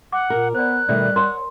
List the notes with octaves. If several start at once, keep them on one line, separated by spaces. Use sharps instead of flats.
F#5 D6
A#2 A#4
B3 C5 D5 F#6
B2 D#3 G3 A3 D5
A#4 C#5 F#5 A#5 C6